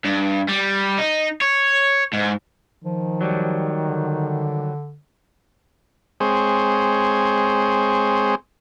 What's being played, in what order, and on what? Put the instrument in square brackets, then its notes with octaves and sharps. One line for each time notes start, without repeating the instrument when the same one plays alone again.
[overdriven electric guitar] G2
G3
D#4
C#5
G#2
[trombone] D#3 [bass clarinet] F3
[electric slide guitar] F#3 G3
[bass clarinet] D3
[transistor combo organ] G#3 C4 G#4 C5 C#5